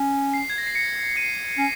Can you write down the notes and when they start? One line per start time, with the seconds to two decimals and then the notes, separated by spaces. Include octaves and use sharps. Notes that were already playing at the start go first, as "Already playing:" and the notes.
Already playing: C#4
0.34 C7
0.50 G#6
0.58 A#6
0.67 C7
0.75 A#6 C#7
1.16 C7 D#7
1.58 C#4 C7